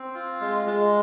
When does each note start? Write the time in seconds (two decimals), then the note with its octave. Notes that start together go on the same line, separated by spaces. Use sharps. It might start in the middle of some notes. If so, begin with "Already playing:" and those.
Already playing: C4
0.15 F4
0.41 G#3
0.66 G#3